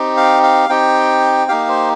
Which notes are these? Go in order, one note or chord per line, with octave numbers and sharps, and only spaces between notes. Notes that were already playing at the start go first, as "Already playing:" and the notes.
Already playing: C4 D#4 G4
F5
F5
C4 D#4 G4 G5
A#3 D#4 G4 F5
C5